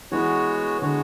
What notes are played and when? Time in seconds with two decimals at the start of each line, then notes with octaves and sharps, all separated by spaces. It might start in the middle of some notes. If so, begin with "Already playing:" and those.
0.12 E3 G#3 B3 F#4 C#5
0.82 D3 G#3 B3 F#4 C#5